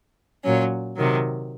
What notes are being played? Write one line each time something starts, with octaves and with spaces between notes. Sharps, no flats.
A#2 F#3 C#4
C3 D#3 F#3